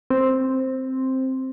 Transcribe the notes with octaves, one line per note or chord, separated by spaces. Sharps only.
C4